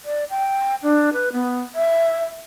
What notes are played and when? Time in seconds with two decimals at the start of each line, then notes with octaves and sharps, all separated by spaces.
0.05 D5
0.30 G5
0.83 D4
1.13 B4
1.33 B3
1.75 E5